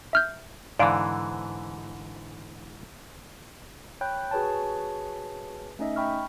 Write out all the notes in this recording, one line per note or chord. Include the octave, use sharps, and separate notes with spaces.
E5 F6 G6
G#2 D3 E3 D5 F5 D7
C#5 G5 B5 F#6 G6
F#4 G#4 B4 C#5 G#5 A5
A3 C#4 D#4 D#5 E5
G5 B5 C#6 F6